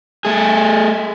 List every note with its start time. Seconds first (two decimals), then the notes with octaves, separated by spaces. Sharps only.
0.25 A3 G#4